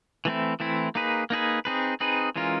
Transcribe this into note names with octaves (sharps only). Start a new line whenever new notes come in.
E3 A3 C4 E4
E3 A3 C4 E4
A#3 D#4 G#4 B4
A#3 D#4 G#4 B4
C4 D#4 G#4 B4
C4 D#4 G#4 B4
E3 G#3 C#4 F4 A#4